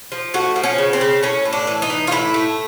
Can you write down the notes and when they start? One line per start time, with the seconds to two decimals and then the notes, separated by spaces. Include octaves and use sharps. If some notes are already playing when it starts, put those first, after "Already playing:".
0.12 F3
0.34 A3 F#4
0.56 F3
0.63 C#4
0.78 C#3
0.93 C4
1.01 C#3
1.23 A2 C#4
1.45 A2
1.53 D4
1.67 E3
1.82 D#4
1.90 E3
2.07 F4
2.11 A2 E4
2.34 A3